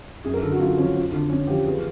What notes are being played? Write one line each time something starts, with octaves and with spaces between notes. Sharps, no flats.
F#2 G#4
A#4
D3 A4
F#4
F#2 F4
F3 C#4
F2
D3
F2 C#4
F3 G4
E2 G#4